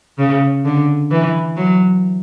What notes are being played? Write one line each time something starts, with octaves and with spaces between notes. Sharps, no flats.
C#3
D3
E3
F#3